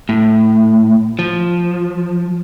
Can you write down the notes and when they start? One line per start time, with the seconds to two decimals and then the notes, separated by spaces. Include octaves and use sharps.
0.09 A2
1.19 F3